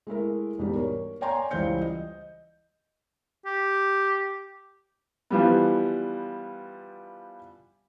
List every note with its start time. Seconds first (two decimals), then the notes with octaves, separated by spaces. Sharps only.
0.07 G#3 A3 E4 A#4
0.58 E1 G#2 G3 G4
0.75 A#4 C#5
1.21 C#5 D5 G5 G#5 A#5 C6
1.51 C#2 E3 G3 C5 G6 C#7
1.81 D#5
3.46 G4
5.30 E3 F3 G3 B3